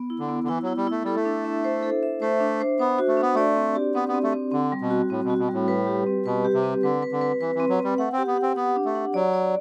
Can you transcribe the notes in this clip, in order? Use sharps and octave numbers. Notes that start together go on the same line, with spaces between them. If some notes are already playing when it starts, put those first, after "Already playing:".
Already playing: B3
E4
D3
B3
D3
E3 E4
F#3 E4
G3
A3 E4
G3 A4
A3
D4
E5
C5
A4
E5
A3 C5
D4
C5
B3 C5
F#4
A3
B3 D4
A3 D5
C4
G4
B3 C4
B3
C4
A3
C4
D3 C4
G3
B2
F#4
A2 C4
B2
F#4
B2
A2 G3
B4
G4
C4
B2 B4
G4
C3
C4
D3 B4
B4
D3
B4
E3 B4
E3 C4
F#3
G3 C4
A3 F#5
C4
G4
B3
F#5
C4
B3 F#5
D4
A3
F#5
F#3 D5
D5